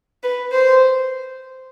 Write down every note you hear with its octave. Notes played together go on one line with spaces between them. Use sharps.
B4
C5